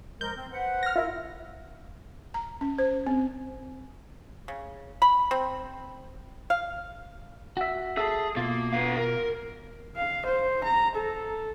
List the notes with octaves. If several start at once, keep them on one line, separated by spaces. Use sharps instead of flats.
F3 G#3 A#4 G6
C4
B4 C5 F#5
F6 A#6
E4 F4 A#4 E5
A#5
C#4
C5
C4
C#3
B5
C4
F5
F#4 E5
G#4 A4 E5
B2 A#3 F4
B3 F5
A#4
F5
C5
A#5
A4